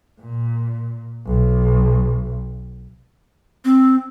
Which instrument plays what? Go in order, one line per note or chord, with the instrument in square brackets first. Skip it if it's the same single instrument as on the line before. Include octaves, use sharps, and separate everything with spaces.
[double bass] A#2
B1
[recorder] C4